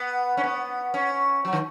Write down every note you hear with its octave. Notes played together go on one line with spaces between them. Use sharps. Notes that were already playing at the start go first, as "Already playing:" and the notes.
Already playing: B3
C#4
B3
C#4
F#3
D#3